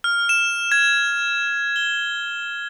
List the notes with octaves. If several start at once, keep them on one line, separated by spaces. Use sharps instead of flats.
F6
E7
G#6
G7